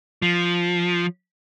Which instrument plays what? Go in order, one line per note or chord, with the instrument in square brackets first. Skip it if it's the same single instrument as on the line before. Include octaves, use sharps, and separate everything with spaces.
[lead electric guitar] F3